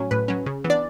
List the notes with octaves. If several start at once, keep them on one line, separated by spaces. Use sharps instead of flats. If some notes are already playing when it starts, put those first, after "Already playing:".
Already playing: A2 F#3 C#4
A2 B4
F#3 C#4
C#3
E3 B3
D4 D5